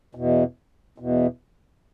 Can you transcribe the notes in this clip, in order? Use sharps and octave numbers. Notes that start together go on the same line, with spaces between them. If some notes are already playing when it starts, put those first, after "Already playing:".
E2 B2
E2 B2